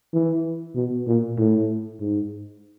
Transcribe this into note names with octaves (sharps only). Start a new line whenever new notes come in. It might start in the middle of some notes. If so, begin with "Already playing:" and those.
E3
B2
A#2
A2
G#2